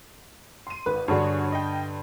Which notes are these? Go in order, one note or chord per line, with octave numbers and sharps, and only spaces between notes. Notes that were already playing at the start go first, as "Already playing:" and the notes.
C6 D#7
G#1 B4
G2 D3 F#4 G#4 C#5
D#5 G5